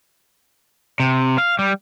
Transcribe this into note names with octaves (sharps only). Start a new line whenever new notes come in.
C3
F5
G3